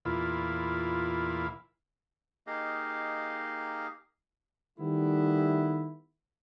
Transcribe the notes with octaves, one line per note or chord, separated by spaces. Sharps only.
E2 A#2 E4 F4 B5
A#3 D#4 G4 G#4 D#5 F5
D#3 G3 A3 B3 E4